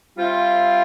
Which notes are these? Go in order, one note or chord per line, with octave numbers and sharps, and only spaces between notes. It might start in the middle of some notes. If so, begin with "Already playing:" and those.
G3 C4 F4 C5 E5